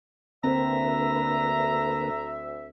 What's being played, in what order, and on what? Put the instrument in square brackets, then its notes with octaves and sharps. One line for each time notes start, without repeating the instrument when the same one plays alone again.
[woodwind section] D2 E5 [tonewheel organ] D3 A#3 B4 [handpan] C4 [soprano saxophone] A#5